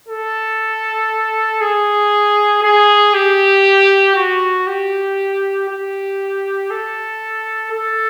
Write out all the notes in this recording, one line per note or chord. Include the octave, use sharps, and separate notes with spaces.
A4
G#4
G#4
G4
F#4
G4
G4
A4
A4